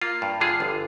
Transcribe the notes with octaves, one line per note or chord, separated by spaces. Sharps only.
A#3 F4
G2
D3 F4 G#4
G1